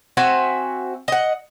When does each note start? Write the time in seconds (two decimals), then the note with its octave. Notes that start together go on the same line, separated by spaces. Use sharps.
0.17 C4 F#4 E5 G#5
1.08 D#5 F#5